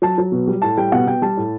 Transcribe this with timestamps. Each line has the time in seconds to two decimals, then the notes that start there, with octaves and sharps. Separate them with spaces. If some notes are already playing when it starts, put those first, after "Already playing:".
0.02 F#3 A5
0.18 F#3
0.32 B2
0.47 G3
0.62 A2 A5
0.77 G3 G5
0.92 B2 F#5
1.07 B2 G5
1.22 G3 A5
1.37 A2